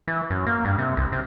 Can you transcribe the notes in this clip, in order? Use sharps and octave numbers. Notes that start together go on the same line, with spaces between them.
E3
F#2
A#3
G2
C3
C2
C3